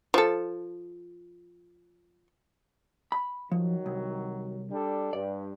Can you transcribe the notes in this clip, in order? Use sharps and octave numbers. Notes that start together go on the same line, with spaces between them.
F3 A4
B5
D#3 F3 F#3
C2
G3 D4 A4
G2 D5